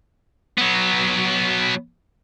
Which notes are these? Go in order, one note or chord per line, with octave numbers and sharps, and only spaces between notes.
F#3 B3